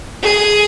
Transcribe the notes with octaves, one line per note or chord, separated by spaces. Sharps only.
G#4